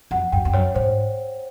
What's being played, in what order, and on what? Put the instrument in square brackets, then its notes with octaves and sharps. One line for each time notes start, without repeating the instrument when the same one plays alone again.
[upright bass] F2 [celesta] F#5
[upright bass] F#2 [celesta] G5
[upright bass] F2
[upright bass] F#2 [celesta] C#5
[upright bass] G#2 [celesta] C5